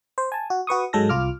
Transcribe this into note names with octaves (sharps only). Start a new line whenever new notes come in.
C5
G#5 A5
F#4
F#4 B4 C#6 D#6
G#2 F#3 G#3 A4 E6 A#6
C2 F4 D6 F6